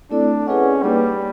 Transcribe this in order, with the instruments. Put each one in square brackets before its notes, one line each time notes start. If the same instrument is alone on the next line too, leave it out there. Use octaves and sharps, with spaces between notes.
[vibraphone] A3 C4 E4 A4 D5 [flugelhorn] D4
[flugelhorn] C#4 [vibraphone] E4 G#4 B4 D#5 F#5
[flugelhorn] G3 [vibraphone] A#3 D#4 G#4 B4